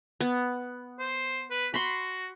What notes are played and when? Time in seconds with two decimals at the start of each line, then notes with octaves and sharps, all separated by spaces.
0.21 B3
0.99 C5
1.51 B4
1.74 F#4 B5 C6